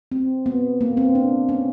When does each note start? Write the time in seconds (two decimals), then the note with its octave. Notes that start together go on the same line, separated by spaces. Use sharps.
0.12 C4
0.46 B3
0.81 A#3
0.97 C4
1.15 D4
1.49 C#4